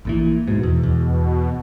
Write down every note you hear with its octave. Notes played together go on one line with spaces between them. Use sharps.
A#1 A#2 E3
G#2 B2
E2
E2